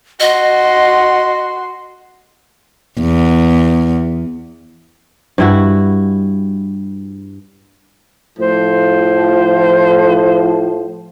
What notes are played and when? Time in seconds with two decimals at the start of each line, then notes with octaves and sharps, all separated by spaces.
0.20 F#4 D#5 C6
3.01 E2
5.38 G2 E4 F#4
8.39 A2 F3 C5